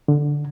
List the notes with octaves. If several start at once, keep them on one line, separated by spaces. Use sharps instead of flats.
D3